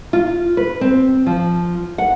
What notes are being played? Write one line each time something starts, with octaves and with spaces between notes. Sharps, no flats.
F4
B4
C4
F3
F#5